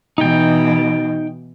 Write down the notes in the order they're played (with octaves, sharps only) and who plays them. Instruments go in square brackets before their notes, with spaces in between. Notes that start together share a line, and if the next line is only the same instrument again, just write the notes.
[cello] B2 E3 [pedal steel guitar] D#4 G5